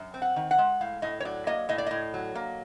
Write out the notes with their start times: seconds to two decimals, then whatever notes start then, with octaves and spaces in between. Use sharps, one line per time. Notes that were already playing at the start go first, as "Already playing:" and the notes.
Already playing: F#2
0.14 C4
0.22 F#5
0.36 D#3
0.51 F#5
0.58 G#3
0.81 A2 F5
1.02 A2 D#5
1.20 C#5
1.25 F#3 D5
1.47 A#3 D#5
1.69 A2 D#5
1.78 D5
1.86 A2 D#5
2.14 F#3
2.35 A#3